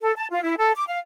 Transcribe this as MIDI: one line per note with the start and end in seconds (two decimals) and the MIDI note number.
0.02 0.13 69
0.17 0.27 81
0.32 0.43 65
0.44 0.55 64
0.58 0.72 69
0.76 0.84 86
0.89 0.99 77